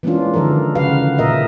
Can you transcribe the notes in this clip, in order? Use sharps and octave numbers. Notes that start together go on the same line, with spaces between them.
E3 G#3 A#3 C#4 D4 F4
D3 D#3 F3 A4 A#4
C#3 F#4 B4 F5
A#2 A#3 A#4 D#5 E5